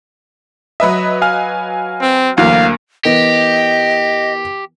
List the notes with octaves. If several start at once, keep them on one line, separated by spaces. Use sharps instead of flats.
F#3 B4 D#5 E5 B5
F5 G#5 F6
C4
D2 E3 F#3 A#3 F5
E3 B3 G4 A#4 D#5